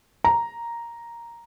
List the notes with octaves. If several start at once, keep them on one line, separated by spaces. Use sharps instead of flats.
A#5